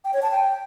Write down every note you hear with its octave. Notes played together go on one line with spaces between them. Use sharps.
G5
C#5
A5
G5